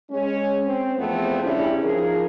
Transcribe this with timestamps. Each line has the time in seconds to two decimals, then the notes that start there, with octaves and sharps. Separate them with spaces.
0.11 G#3 C#4
0.66 C4
0.97 E2 F3 A3 B3 C4
1.43 C#3 G3 C#4 D4 E4
1.83 F3 D#4 G#4 A#4